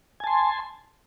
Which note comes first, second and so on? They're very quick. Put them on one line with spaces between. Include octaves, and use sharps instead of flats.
G#5 A5 C6